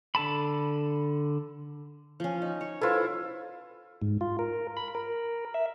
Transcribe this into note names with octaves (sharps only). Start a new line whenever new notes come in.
D3 A4 A5 B5
F3 C#4
D#4
C#5
E4 F4 A4 B4 C5
G#2
F4
A#4
B5
A#4
E5